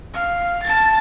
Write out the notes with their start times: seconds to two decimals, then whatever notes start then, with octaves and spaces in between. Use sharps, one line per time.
0.14 F5
0.63 A5 A6